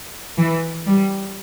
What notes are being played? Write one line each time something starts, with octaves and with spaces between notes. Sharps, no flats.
E3
G3